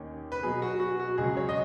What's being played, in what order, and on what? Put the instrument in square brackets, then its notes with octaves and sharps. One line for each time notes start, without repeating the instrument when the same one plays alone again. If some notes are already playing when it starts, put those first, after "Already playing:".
Already playing: [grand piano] D#2 D#3 C#4
B4
B2 F#3 B3 G#4
F#4
F#4
F#4
C#2 C#3 F#3 G#4
C#5
D#5